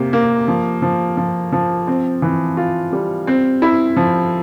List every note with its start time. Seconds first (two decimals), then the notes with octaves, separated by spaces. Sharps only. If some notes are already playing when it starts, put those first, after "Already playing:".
Already playing: C3 A#3
0.13 A#3
0.48 F3
0.82 F3
1.17 F3
1.52 F3
1.87 C4
2.22 E3
2.57 F4
2.92 G3
3.27 C4
3.62 E4
3.97 F3